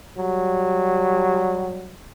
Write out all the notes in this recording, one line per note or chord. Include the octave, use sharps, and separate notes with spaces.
F#3 G3